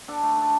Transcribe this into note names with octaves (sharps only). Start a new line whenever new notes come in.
D4 A4
A3
D4 A4